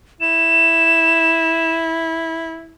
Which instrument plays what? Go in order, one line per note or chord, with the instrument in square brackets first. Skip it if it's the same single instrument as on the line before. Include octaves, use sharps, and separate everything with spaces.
[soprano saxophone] E4 [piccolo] E7